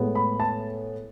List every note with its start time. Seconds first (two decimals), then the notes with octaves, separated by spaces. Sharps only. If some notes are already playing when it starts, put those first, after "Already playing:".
Already playing: A2 G#3 B3
0.15 B5
0.40 A5